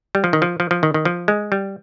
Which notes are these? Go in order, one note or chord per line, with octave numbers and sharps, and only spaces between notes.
G3
F3
D#3
F3
F3
F3
D#3
D#3
F3
G#3
G3